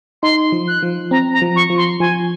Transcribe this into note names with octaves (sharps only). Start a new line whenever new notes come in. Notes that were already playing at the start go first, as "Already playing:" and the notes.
D#4 C6
F3
F#6
F3
C4 A#5
A#5
F3
C#6
F3
C6
F3 G#5